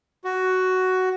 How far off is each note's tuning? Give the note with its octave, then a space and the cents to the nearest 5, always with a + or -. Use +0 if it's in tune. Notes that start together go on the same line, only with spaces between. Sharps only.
F#4 +10